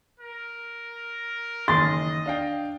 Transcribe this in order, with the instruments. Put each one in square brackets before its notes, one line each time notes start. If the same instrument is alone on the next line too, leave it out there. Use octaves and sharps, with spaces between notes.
[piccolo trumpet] A#4
[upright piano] F#1 D#3 E3 [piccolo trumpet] D#5 [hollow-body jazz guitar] C6 [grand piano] A6
[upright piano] D4 F5 G5